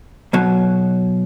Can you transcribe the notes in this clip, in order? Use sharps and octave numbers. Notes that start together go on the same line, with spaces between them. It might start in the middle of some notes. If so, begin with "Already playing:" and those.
B1 B2 F#3